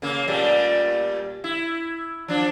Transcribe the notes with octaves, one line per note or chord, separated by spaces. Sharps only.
C#3 A#3
A#2 G3 A3
E4
F3 D4